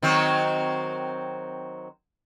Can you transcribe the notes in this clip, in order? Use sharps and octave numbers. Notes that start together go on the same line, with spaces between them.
D#3 F#3 C4